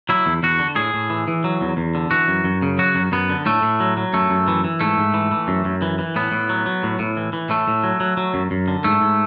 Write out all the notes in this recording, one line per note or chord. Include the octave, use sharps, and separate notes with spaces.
F#3 E4
E2
E2 F#4
D3
A2 G#4
A2
E3
E3
F#3
E2
E2
D3
E3 F#4
F#2
F#2
C#3
F#3 F#4
F#2
F#2 B3
D3
A2 A3
A2
F#3
F#3
F#2 A3
F#2
E3
E3
G#2 A3
G#2
E3
E3
F#2
F#2
E3
E3
A2 B3
A2
F#3
F#3
A2
A2
E3
E3
A2 A3
A2
F#3
F#3
F#3
F#2
F#2
D3
G#2 A3
G#2